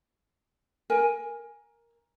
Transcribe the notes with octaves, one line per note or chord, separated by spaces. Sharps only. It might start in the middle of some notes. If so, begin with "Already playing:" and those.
A#4 G#5